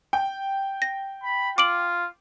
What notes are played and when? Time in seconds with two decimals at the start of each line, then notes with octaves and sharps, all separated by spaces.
0.13 G5
0.82 A#6
1.23 B5
1.58 F4 D6 D7 F#7